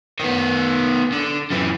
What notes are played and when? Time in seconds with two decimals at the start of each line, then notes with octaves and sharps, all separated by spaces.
0.20 D#3 B3
1.12 D3
1.50 F#2 E3